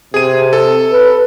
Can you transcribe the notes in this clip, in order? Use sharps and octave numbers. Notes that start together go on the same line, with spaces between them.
C3 G#4 D#7
A4
B4